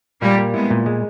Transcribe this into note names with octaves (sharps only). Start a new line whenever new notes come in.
A#2 G3 A#3
A#3
G#3 B3 E4
A#2
G#3